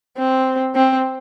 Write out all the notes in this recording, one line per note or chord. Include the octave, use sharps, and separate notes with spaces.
C4
C4